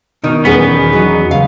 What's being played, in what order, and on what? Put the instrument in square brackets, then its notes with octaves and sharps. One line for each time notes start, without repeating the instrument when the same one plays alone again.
[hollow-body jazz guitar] B2 D#3 D#4
[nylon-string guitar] E2 C#4 G#4 [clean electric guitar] B3
[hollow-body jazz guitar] F#3 D#4
[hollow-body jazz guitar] C#2 [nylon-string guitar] F5